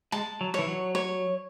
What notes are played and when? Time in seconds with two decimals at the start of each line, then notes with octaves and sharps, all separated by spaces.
0.12 G#3 A5
0.41 F#3
0.54 E3 C#5
0.68 F#3
0.95 C#5